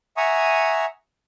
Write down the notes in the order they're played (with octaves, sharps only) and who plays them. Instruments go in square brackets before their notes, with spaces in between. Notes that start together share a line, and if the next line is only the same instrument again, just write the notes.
[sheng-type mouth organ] E5 F#5 G#5 A#5 C#6 D#6